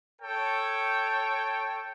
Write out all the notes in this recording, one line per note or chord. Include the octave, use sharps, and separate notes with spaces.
A4 C#5 G5